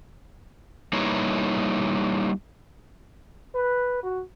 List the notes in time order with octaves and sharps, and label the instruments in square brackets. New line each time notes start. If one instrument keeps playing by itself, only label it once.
[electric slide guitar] G3 A#3 D#4 E4 B4 C#5
[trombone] B4
F#4